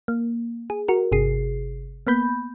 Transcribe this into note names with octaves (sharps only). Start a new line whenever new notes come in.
A#3
G#4
F#4 A#4
G1 C3 G#4 C7
A#3 B3 B5 G6